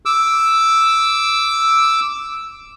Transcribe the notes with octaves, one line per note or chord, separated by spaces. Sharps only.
D6 E6